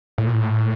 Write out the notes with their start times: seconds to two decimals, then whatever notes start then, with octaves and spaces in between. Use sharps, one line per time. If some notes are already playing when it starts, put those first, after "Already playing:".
0.18 A2
0.27 A#2
0.35 A2